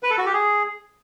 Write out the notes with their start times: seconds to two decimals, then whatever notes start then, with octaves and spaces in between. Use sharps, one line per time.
0.03 B4
0.11 A4
0.18 F#4
0.26 G4
0.33 G#4